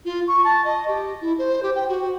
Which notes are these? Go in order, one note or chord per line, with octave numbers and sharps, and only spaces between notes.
F4
C#6
A5
D#5
G4
E4
C5
G4
G5
F#4